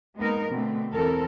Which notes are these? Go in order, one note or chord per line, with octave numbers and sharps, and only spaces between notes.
G#3 A#3 B3 D#4 A#4
B2 D3 A3 C4
E2 C4 A4 A#4